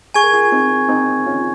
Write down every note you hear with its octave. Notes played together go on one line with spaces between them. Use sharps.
G#4 G#5 C#6 G#6
A#4
F4 G#4
C4 D#4
C4 D#4
C#4 F4